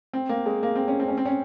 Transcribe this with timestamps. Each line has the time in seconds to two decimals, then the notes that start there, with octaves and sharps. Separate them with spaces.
0.13 C4
0.29 A#3
0.46 G#3
0.63 A#3
0.75 C4
0.88 C#4
1.00 C4
1.08 C#4
1.18 C4
1.26 C#4